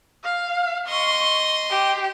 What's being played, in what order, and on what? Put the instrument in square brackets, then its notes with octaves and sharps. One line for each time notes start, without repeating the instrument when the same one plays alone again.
[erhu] F5
[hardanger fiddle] D#5 C6 [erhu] C#6
[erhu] G4